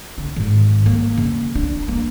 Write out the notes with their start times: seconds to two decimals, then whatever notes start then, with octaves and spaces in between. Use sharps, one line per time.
0.18 D3
0.36 G#1
0.86 A#3
1.18 C#3
1.55 D4
1.88 A#3